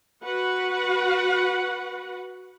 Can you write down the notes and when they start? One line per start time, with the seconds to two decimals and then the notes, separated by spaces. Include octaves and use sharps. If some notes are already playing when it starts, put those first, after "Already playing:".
0.25 F#4 B4 F#5